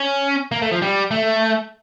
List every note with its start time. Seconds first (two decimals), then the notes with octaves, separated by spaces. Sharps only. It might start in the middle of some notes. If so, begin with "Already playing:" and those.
Already playing: C#4
0.52 A#3
0.62 A3
0.71 F3
0.82 G3
1.11 A3